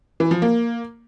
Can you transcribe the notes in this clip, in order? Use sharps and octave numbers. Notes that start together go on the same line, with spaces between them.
E3
F3
A#3